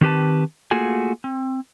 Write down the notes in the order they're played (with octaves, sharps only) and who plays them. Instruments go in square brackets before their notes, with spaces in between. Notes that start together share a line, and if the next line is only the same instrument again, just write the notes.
[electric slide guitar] D#3 C4 G4 B4 A5
A3 A#3 F4 F#4 G#4 G#5
C4